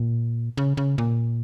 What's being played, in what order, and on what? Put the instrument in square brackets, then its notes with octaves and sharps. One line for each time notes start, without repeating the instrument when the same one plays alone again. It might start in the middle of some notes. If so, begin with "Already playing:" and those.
Already playing: [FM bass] A#2
C#3
C#3
A#2